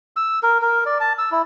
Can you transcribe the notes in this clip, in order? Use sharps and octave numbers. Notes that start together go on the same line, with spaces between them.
E6
A#4
A#4
D5
A5
E6
E4